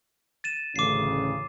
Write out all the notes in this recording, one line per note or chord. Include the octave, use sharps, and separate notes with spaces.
A6 D#7 E7
A1 D2 C#3 D6 C7